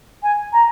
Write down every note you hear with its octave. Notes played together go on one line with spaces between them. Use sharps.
G#5
A#5